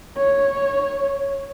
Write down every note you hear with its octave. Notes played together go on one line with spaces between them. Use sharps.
C#5